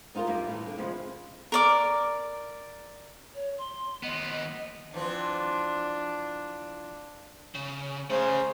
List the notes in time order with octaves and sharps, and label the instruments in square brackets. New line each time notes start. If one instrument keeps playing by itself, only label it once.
[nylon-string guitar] B3 D#4 F4 F#4 A#4
F#2 A#2 G3 A#3
A2 E3
D3
C3 F3 G#3 B3 C#4
[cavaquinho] A#4 D5 D6
[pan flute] C#5
C6
[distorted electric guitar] D#2 B3 [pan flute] D#5
[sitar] E3 F3 C4 [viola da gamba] D4
[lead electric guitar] C#3
[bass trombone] C#3 [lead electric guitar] A3 G#5 [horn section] C5